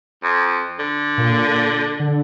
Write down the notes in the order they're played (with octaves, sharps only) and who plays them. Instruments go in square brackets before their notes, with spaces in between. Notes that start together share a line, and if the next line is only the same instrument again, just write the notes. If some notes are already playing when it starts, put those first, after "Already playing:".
[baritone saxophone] F2
D3
[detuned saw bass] A#2
D3